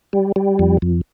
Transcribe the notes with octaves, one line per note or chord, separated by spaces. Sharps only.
G3
G3
F2
F2